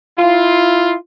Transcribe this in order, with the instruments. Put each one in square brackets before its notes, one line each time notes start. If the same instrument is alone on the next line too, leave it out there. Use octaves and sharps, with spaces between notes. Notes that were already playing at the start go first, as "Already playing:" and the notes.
[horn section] E4 F4